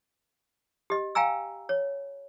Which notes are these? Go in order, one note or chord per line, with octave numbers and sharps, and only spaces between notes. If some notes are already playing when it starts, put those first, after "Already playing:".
G4 D#5
F5 G5 G#5 A#5 E6
C#5